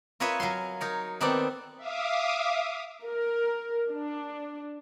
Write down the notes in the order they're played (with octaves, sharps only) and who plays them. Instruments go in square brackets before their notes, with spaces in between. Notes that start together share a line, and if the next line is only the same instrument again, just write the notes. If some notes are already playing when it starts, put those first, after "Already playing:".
[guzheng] F4 A#4 B4 C#5 D#5 E5
F#3 F5 G#5 C6
D#4 A#4 C#5
D#3 B3 C4 D#4 A4 D5
[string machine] E5 F5 D6 D#6
[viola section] A#4
D4